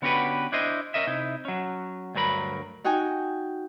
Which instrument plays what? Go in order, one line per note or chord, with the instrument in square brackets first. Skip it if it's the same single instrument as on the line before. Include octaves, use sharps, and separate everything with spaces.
[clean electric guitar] D3 B3 C#4 F#4 G4 B4
D4 E4 C5 D#5
C#4 A#4 D#5 E5
C3 D#4 E4
F#3 C#4
D2 G2 F#3 A#4 B5
[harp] D#4 F#4 G5 G#5